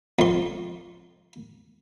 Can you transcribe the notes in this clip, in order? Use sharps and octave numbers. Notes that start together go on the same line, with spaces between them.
F2 C6